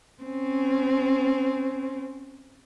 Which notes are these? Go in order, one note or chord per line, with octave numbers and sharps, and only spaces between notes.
C4 C#4